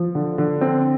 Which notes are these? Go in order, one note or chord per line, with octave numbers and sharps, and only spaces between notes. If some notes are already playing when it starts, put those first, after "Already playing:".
Already playing: F3
D3
D3
C4